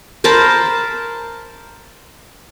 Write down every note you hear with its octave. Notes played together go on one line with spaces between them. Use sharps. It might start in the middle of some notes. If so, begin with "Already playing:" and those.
A#4 C5 A5 B5